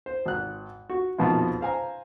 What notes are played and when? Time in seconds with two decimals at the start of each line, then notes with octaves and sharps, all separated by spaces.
0.06 C5
0.25 G#1 F#6
0.90 F#4
1.18 A#1 F2 B2 D#3 F3 F4
1.61 C5 F5 G#5 A#5